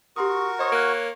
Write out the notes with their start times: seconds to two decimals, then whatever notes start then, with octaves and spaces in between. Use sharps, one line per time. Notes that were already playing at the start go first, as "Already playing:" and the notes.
0.16 F#4 G4 A#4 C6 C#6 D#6
0.59 C5 C#5 D#5 D#6
0.72 A#3 F6 F#6